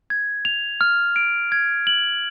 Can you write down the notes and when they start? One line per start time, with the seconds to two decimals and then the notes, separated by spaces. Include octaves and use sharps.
0.10 G#6
0.45 F7
0.81 F6
1.16 D7
1.52 G#6
1.87 F#7